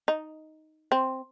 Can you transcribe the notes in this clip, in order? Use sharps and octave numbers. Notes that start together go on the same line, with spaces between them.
D#4
C4